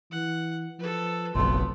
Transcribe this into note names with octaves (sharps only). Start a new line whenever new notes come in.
E3 F#5
F3 A4 B4
F#1 B1 F2 A3 B3 C6